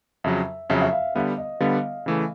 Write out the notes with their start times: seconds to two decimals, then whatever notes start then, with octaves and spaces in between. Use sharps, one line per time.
0.24 F2 C#3 F#3 E5
0.70 F2 C#3 F#3 E5
0.82 E5
0.93 F5
1.15 D3 G3 B3 F5
1.38 D#5
1.60 D3 G3 B3 F5
2.06 C#3 E3 A3